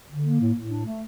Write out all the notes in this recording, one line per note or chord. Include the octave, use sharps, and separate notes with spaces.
D3
A#3
A2
A2
D4
A3